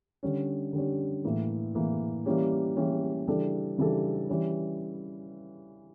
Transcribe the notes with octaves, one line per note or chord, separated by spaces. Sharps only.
D3 G3 C#4
D3 G3 C#4
A2 E3 A#3
A2 E3 A#3
E3 G3 A#3 C#4 G4
E3 G3 A#3 C#4 G4
C#3 E3 G3 D4 A4
C#3 E3 G3 D4 A4
E3 G3 C#4